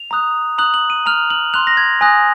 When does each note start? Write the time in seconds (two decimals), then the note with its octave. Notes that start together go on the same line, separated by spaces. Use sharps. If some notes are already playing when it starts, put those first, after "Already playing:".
Already playing: F7
0.11 A#5 D#6 F#6
0.58 A#5 D#6 F#6 F#7
0.74 F#7
0.90 D#7
1.06 A#5 F6 F7
1.30 F#7
1.54 C6 F#6 F7
1.67 A#6
1.77 G#6
2.01 G#5 D#6 F#6 A#6